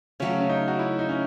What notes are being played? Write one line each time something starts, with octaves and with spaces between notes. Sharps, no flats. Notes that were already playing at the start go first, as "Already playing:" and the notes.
C#3 F#3 A3 C#4
C#4
D#4
F#4
E4
D#4
C#4